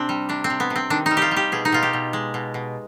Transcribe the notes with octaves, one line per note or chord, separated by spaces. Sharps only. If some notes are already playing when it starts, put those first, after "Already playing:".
Already playing: C3 C4 D4
G3
C3 D4
C4
C3
B3
C3
C4
D#3 D4
G3 D#4
F4 G4
G3
G4
B2 G#4
D#4
B2 F4
G4
B2
G#3
B2
B2